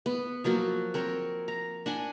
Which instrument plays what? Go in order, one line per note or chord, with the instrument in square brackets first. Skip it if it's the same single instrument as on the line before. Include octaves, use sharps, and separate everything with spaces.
[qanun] B3
F3 F#3 A#3 F#4
C4 A#4 C#5
A#5
D4 F#5 G#5